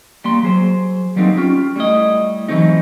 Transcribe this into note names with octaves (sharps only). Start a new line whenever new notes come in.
G3 A#3 C6
F#3 G#4 C5
F#3 G3 A#3 C4 C#4 D#4
C#4 F4 G4
G3 A3 E4 D#5
E3 F#3 A3 C4 D#4